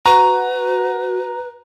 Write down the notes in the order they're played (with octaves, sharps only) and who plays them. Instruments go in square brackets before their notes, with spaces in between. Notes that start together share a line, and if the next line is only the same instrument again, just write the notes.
[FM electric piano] F#4 [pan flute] B4 [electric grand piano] A#5